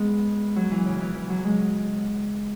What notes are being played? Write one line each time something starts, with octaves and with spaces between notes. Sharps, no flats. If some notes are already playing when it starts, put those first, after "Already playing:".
Already playing: G#3 B3
F#3
E3
C#3
E3
E3
F#3
G#3